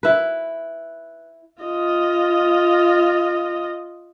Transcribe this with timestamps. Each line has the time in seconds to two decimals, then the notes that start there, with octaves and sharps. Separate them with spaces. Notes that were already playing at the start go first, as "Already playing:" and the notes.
0.03 E4 B4
1.63 F4 D#5